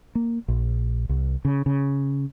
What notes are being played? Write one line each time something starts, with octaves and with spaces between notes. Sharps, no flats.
A#3
A#1
C2
C#3
C#3